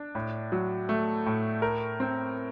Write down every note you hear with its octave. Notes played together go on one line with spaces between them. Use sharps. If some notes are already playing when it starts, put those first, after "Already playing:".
Already playing: D4
A2
F#3
A3
A2
A#4
C4